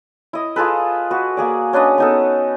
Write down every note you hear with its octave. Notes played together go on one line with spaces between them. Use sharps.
E4 D#5
F4 G#4 A4 B4
F#4 B4
A#3 G#4 D5
C#4 D4 B4 D#5
B3 D#4 A4